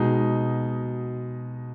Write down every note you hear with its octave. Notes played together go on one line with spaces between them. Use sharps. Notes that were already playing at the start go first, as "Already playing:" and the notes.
Already playing: B2 G#3 D#4